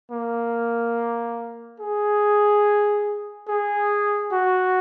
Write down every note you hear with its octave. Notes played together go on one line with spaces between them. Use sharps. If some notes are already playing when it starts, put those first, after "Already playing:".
A#3
G#4
G#4
F#4